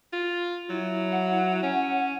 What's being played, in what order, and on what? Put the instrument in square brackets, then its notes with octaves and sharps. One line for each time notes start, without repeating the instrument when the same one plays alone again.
[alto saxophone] F4
[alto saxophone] F#3 [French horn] E4
[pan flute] F#5
[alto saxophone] C#4